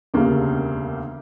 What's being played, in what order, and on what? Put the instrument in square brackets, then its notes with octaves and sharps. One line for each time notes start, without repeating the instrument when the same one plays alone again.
[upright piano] E1 D2 C#3 G3 A#3